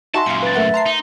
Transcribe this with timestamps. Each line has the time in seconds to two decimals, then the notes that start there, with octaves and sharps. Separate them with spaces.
0.14 D#4 F#4 E5 G#5 A5 C6
0.26 F#2 A#2 F5 C#7
0.43 B4 A6
0.56 A3 A#4 E5 F#5
0.74 A5 A#5 C6 C7
0.86 D#4